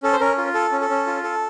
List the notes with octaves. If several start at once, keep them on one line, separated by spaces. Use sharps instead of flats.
C#4 A4
C5
C#4 A#4
F4
A4
C#4
A4
C#4
F4
A4